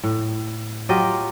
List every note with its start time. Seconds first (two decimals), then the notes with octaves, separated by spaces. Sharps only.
0.03 A2
0.89 F#3 F4 G4 D#5